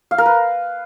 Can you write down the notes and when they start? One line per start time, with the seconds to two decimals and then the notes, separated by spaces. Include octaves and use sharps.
0.11 F5
0.18 A#4
0.26 B4